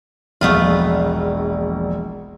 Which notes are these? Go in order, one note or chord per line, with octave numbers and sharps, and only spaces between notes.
E1 A#1 A3 B3 F4